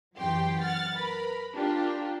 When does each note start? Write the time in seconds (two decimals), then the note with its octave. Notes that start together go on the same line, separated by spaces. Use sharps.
0.16 F#2 E3 F#3 G4 G5 C6
0.62 F#5 F6 A6
0.95 A#4 B4 B5
1.56 D4 F4 G4 A#4